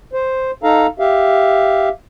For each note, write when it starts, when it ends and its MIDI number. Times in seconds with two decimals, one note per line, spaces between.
0.13 0.51 72
0.63 0.87 63
0.63 0.87 69
0.63 0.87 77
0.63 0.87 82
0.99 1.89 67
0.99 1.89 76
0.99 1.89 77